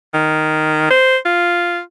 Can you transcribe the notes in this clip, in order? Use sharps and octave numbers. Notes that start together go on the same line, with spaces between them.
D#3
C5
F4